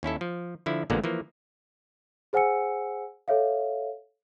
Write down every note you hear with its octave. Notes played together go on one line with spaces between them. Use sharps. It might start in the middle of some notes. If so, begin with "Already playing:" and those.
D#2 C#4 E4 A4
F3
D3 F3 E4
A1 A#2 D3 G#3 A#3 B3
E3 F3 A#3
G#4 C5 F#5 G#5 E6 C#7
A4 C#5 E5 F5